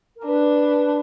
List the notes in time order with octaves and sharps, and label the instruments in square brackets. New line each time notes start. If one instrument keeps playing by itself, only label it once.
[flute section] A#4
[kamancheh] D4 [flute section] B4